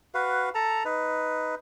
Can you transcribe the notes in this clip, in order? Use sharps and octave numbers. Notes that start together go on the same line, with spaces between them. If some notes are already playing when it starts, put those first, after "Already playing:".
F#4 B4 F5
A4 A5 A#5
D#4 B4